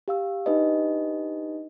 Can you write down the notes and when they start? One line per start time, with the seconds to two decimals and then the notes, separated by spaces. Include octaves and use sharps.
0.08 G4 F5 E6
0.46 D4 D#4 G4 B4 D#5